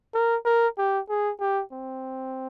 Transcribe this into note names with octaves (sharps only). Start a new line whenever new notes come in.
A#4
A#4
G4
G#4
G4
C4